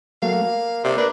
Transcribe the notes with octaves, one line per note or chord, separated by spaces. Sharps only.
F#3 A3 A#3 F5
A#3
C3 D5
D4 A#4 B4 D5